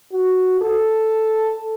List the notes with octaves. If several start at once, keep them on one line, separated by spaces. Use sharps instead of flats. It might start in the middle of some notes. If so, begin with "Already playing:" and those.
F#4
A4